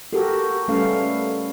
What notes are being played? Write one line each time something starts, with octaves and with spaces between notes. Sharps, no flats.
F#4 G4 A4 A#4
G3 A3 C#4 A4 B4 F5